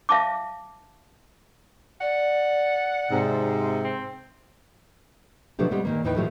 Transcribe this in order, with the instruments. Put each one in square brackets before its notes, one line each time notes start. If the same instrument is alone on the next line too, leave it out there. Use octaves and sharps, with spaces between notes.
[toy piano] E5 F5 A5 D6
[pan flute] D5 [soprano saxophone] F#5
[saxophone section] G#2 C3
[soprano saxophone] C4
[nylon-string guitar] B2 F3 F#3 A3 D4 G4
G3 G#3 B3 C4
A#2 D#3 A#3
D#2 A2 E3 D#4 B4 G5
A2 D#3 F3 F#3 A3 G4